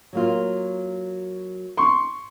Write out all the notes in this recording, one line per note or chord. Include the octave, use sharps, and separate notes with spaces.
F#3 A#3 F4
C6 C#6